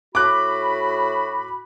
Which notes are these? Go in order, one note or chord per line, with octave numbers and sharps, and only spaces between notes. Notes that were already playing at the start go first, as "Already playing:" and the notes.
A2 F#4 B5 D6 F#6